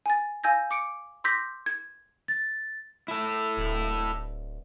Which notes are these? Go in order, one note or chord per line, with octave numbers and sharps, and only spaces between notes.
G#5 A6
F5 G#5 E6 G6 G#6 A#6
D6 C#7 D7
C6 D6 E6 G6 A#6 B6
G#6
A6
E4 A4
D1